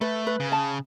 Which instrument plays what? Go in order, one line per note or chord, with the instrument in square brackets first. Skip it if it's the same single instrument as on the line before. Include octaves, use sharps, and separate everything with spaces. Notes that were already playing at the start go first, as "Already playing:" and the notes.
[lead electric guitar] A3 [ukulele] B4
[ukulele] B4
[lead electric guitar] C#3
[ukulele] A5